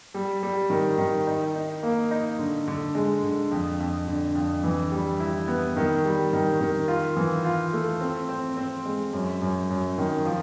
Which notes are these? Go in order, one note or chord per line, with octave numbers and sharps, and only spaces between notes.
G3
G3
D#3
D#3
D#4
D#4
A#3
D#4
D3
D3
G#3
D3
F2
F2
D3
F2
E3
G3
E4
B3
D#3
G3
D#3
D#3
F4
E3
F4
A3
C4
C4
C4
G#3
F#2
F#2
F#2
D#3
F3